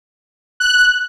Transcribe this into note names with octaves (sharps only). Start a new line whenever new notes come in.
F#6